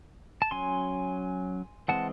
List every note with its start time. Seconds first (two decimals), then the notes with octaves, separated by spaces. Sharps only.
0.42 A5
0.51 F#3 C#4 G#5 C6
1.88 E3 G#3 C4 F#5 A5